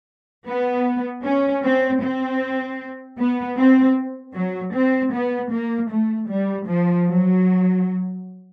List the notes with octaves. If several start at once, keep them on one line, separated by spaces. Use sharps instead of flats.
B3
C#4
C4
C4
B3
C4
F#3
C4
B3
A#3
A3
G3
F3
F#3